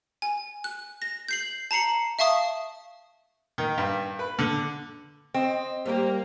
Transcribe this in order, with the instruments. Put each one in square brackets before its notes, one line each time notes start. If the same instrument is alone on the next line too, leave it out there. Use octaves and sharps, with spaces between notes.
[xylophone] G#5
F#6
A#6
G6 C7 F#7
A5 A#5 C7 C#7 F#7
E5 F5 A5 C#6 D#6
[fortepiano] D#3
G2
B4
D3
[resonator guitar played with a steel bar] C4 [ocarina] D#5
[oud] G3 G4 [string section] A#3 [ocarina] C5